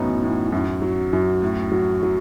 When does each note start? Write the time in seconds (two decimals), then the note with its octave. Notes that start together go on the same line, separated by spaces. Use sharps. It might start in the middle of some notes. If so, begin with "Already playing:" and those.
Already playing: F#2 A2 E3 F#3 B3 C#4 D#4
0.23 A2
0.52 F#2
0.82 F#3
1.13 F#2
1.42 A2
1.72 F#3
2.03 F#3